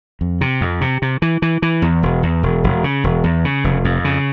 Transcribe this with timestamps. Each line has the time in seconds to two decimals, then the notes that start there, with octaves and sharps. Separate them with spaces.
0.21 F2
0.41 C3
0.61 F2
0.81 C3
1.02 C3
1.22 E3
1.42 E3
1.62 E3
1.82 E2
2.03 E1
2.23 E2
2.43 E1
2.64 E1
2.84 C#3
3.04 E1
3.24 E2
3.45 C#3
3.64 F1
3.84 F2
4.04 C#3